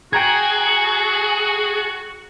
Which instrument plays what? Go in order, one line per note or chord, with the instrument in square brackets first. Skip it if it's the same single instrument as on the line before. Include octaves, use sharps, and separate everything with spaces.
[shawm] F#4 [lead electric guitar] G#4 [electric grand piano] G5 A#5 G#6